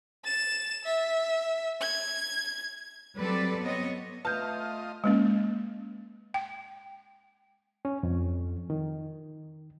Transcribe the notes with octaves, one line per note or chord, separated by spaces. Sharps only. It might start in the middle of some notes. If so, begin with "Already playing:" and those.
A6 E7
E5
G#6
F#3 G3 C4 A4 B4 D5
B3 C4 C#5 D#5
A3 F4 B4 D#5 A5 F6 G6
G#3 A#3 C#4
G5
C#4
F2
D#3